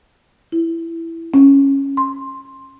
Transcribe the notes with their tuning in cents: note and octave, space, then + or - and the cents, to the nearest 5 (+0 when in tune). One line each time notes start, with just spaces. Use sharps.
E4 +5
C#4 -10
C6 +5